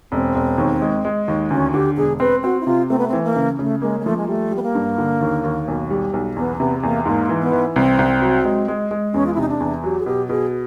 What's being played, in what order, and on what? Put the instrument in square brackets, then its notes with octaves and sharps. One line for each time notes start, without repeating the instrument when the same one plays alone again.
[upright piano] E1 [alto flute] C4
[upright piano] E1
D#2
G#3
G#3
D#2
[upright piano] D2 [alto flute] C#4
[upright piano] D3 [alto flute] G4
[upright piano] E1 [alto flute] G#4
[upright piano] C4 [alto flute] B4
[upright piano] C4 [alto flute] F#4
[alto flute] E4
[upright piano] C3 [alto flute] F4
[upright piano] A3 [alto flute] C4
[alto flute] B3
[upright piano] E3 [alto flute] C4
[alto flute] A#3
[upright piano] C#3
[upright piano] C#3 [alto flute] A3
[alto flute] G#3 [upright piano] A#3
[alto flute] G#3
[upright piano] F3 [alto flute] A3
[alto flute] G#3
[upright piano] G3 [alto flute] A3
[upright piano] G3
[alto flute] B3
A#3
[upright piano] G2
D3
D#2
D#2
B1
G3
B1
[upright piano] E2 [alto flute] B3
[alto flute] C4
[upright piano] C3 [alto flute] B3
[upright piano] E2 [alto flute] A#3
[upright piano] G#2 [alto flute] A#3
[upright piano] E3
[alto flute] B3
[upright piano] E3
[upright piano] C2 [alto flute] C4
[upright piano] C2
F#3
G#3
G#3
G#3
[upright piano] E2 [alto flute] C#4
[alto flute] F4
E4
[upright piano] C3 [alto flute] D#4
[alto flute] D4
[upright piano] E2
[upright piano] F#3 [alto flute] G4
[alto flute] G#4
[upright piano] B2 [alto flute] G4
[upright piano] B2 [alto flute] G#4